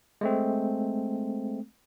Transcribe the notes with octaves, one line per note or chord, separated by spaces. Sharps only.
G#3 A3 C4